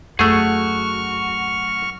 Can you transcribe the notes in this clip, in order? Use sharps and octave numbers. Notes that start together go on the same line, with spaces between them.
F#2 A3 F#4 G#4 C#6 F6